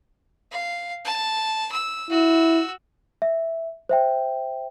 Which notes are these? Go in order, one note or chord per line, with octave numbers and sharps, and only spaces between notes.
F5
A5
E6
E4 F#4 E6
E5
C5 E5 G5